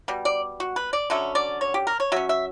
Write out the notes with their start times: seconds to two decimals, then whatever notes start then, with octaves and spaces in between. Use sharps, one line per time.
0.08 B2 G3
0.25 D5
0.60 F#4
0.76 B4
0.93 D5
1.10 D3 F#3 C#4 E5
1.35 D5
1.61 C#5
1.74 G4
1.87 A#4
2.00 C#5
2.12 F#3 C#4 E5
2.29 E5